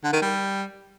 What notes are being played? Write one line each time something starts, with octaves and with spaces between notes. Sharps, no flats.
D3
D#3
G3